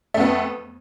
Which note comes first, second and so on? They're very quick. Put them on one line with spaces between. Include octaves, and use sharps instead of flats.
A3 F2 B3